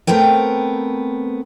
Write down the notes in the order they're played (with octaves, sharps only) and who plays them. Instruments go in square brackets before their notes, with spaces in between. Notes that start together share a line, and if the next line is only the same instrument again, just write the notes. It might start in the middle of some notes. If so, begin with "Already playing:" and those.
[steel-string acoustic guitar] A3 B3 C4 A#4 G5